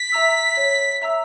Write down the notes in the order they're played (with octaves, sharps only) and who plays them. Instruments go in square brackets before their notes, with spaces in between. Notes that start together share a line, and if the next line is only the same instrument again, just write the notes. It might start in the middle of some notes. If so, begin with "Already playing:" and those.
Already playing: [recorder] B6
[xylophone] E5 A#5 E6
C#5
E5 A#5 E6